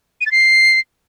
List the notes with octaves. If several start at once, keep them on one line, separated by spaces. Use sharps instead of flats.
D#7
A6
C7